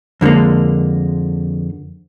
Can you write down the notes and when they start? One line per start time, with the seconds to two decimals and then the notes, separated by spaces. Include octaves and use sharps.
0.21 F2 D3 G3 G#3 A#3